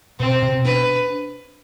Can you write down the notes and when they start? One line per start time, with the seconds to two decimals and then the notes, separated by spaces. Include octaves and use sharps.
0.19 B2 C4
0.42 B2
0.65 D4 B4